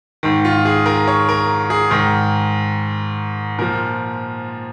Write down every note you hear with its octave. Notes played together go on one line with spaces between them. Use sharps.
G#2 D#3
F4
G#4
A#4
C#5
A#4
G#4
G#2 D#3 A#4
A#2 F3 A#4